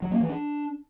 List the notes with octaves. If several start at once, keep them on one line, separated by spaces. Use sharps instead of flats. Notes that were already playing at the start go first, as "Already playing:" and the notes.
F#3
A#3
E3
D4